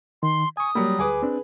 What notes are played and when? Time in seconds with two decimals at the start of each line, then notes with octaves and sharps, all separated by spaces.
0.23 D#3 C6
0.57 G#5 C#6 D#6
0.75 F#3 G3 A#3
0.99 D2 G#4 B4 G#5 D6
1.22 C4 D4